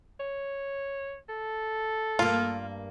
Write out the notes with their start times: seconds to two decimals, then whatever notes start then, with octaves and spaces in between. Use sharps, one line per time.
0.20 C#5
1.29 A4
2.19 G2 A#3 F4